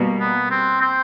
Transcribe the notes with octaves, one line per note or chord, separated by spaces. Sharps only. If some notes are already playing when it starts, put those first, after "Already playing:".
Already playing: B2 G3 A#3
B3
C4
C4